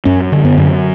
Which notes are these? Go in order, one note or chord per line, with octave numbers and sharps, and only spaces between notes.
F#2 C#4
D3
B3
F#2